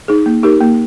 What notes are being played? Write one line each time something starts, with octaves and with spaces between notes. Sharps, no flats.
D#4 G#4
A#3
D#4 G4 A#4
A#3